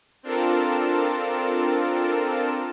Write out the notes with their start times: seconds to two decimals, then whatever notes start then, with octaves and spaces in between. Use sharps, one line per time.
0.23 C4 D4 F4 A4 A#4 A5